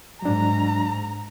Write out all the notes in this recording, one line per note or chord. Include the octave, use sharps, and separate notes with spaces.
G#2 F#3 D4 A#5